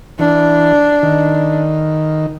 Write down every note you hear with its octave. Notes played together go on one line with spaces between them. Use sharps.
E3 D4
D#3